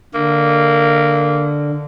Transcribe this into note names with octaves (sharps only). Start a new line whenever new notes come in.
D3 A#3